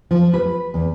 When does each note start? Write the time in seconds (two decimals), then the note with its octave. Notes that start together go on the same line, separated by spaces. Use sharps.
0.11 F3
0.34 B4
0.74 E2